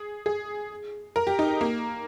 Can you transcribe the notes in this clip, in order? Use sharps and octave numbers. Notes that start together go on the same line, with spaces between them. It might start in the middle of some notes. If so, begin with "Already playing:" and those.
Already playing: G#4
G#4
A#4
G4
D#4
A#3